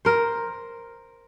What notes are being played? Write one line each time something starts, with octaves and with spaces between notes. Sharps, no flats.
A#4 C5